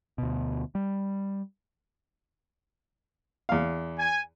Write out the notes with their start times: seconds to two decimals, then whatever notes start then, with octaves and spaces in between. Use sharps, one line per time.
0.18 D2 B2
0.75 G3
3.49 E2 F5
3.99 G#5